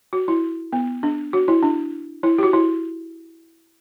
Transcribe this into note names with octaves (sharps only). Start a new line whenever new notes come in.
F#4
E4
B3
D4
F#4
E4
D4
E4
G4
F#4
E4